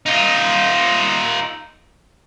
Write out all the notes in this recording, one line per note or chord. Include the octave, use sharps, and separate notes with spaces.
D#4 F4